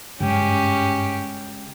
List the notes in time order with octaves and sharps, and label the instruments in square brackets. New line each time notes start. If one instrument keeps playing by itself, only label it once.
[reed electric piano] G2 [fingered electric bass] C#3 G#3 [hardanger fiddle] C#4 G4